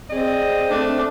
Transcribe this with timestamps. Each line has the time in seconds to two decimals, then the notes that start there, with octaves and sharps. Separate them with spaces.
0.10 C4 G#4 D5 D#5
0.70 A3 D4